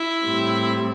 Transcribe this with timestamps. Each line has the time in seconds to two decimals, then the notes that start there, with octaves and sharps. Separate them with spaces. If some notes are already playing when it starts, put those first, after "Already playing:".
Already playing: E4
0.23 A2 G3 C4